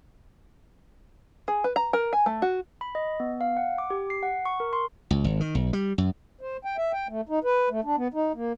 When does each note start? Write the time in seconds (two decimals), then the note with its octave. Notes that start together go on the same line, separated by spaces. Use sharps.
1.48 G#4
1.64 B4
1.76 A#5
1.93 A#4
2.13 G#5
2.26 A3
2.42 F#4
2.81 B5
2.95 D#5
3.20 B3
3.41 F5
3.57 F#5
3.78 D6
3.90 G4
4.10 C7
4.23 F#5
4.45 C#6
4.60 A#4
4.73 C6
5.11 C#2
5.24 G#1
5.40 D#3
5.55 B1
5.73 G3
5.98 F#2
6.41 C5
6.65 G5
6.77 E5
6.93 G5
7.09 A3
7.29 D#4
7.44 B4
7.70 A3
7.84 D4
7.97 B3
8.14 D#4
8.35 A#3